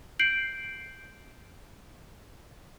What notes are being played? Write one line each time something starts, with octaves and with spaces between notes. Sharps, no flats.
G6 C7 D7 F#7